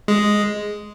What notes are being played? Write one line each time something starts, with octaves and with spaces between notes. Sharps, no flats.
G#3